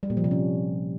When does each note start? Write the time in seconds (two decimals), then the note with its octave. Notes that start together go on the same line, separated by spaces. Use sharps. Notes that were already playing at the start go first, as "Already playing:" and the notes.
0.03 G3
0.10 A#2
0.17 F3
0.24 C3
0.31 C#4